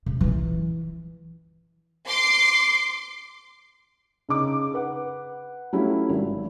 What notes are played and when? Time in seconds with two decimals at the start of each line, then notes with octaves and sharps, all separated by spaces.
0.06 C3
0.21 E3 E4
2.07 C6 D6 C7
4.29 C#3 D#4 D6
4.74 B4 F#5
5.73 F#3 A3 C#4 E4 F4 G4
6.09 G#1